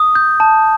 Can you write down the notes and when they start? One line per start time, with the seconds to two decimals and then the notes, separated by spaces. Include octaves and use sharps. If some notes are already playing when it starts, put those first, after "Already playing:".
Already playing: D#6
0.15 G6
0.40 A5